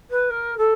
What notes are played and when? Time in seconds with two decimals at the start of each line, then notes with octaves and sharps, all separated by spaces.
0.11 B4
0.30 A#4
0.58 A4